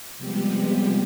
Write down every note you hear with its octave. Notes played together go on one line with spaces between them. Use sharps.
C3 F3 G3 G#3 B3 G4